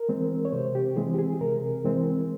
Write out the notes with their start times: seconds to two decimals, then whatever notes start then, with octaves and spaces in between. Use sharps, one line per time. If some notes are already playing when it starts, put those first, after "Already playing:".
Already playing: A#4
0.09 E3 G#3 C4
0.45 C#5
0.52 C3 C5
0.75 G4
0.96 E3 G#3 C4 G#4
1.14 G4
1.19 G#4
1.41 C3 A#4
1.84 E3 G#3 C4